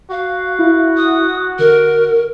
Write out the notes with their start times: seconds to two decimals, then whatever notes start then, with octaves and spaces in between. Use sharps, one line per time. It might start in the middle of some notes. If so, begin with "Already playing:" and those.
0.11 F#4 F5
0.59 E4
0.97 D#6
1.59 D3 A#4